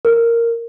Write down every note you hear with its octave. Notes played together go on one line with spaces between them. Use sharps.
A#4